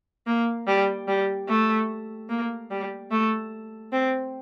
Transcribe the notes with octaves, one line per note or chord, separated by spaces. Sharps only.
A#3
G3
G3
A3
A#3
G3
A3
C4